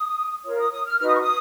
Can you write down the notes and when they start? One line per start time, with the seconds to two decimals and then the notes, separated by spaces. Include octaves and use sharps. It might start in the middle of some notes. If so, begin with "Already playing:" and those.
Already playing: D#6
0.44 F4 A#4 C#5
0.59 D#6
0.71 D#6
0.86 F6
0.99 D#4 F#4 B4 F6
1.06 D#6
1.14 C#6
1.21 D#6